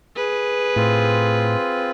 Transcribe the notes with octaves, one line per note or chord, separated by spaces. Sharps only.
G#4 B4
A2 C4 F4